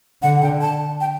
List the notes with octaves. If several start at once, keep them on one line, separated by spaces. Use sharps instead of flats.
D3 F#5
G5
A5
G5